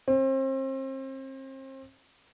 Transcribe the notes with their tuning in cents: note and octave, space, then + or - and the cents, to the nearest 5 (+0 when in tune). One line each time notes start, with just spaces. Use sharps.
C4 +35